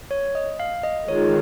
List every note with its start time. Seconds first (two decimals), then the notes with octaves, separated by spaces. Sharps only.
0.11 C#5
0.35 D#5
0.60 F5
0.83 D#5
1.08 D#3 G#3 F4 C#5